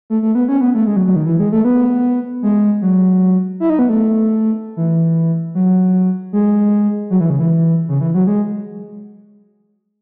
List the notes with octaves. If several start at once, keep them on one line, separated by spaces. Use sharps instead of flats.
A3
A3
B3
C#4
B3
A3
G#3
F#3
F#3
D#3
E3
G#3
A3
B3
G#3
F#3
E4
D#4
B3
A3
E3
F#3
G#3
F#3
E3
C#3
E3
C#3
E3
F#3
G#3